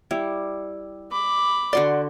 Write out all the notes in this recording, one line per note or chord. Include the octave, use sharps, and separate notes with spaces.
G3 E4
B5 D6
D3 F#4 D5 C6